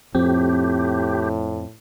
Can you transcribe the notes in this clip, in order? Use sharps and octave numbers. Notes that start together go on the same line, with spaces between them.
F2 A2 C4 G4